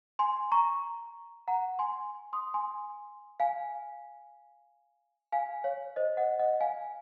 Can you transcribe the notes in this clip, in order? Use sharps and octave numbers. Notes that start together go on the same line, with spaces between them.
G#5 C6
A#5 C#6
F#5 A#5
G#5 C6
C6 D#6
G#5 C6
F5 G#5
F5 G#5
C#5 F5
C5 D#5
D#5 F#5
D#5 F#5
F5 G#5